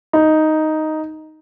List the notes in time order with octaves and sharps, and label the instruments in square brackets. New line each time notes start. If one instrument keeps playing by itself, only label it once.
[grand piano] D#4